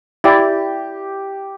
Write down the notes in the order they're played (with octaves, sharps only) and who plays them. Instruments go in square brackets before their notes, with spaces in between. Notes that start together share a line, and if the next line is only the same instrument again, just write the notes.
[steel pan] E4 D5 [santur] G4